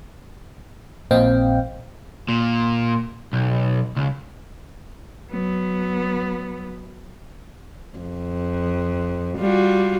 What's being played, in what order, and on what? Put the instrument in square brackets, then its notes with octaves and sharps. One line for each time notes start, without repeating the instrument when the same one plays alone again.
[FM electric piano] A#1 A#2 C4 D#5 F5 G5
[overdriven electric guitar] A#2
B1
C#2
[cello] F#3 B3
[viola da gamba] F2
G3 F4 F#4